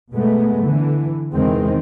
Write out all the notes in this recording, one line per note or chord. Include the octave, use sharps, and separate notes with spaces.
B2 G#3 A3 B3
D3 E3
E2 C3 D#3 E3 G#3 C4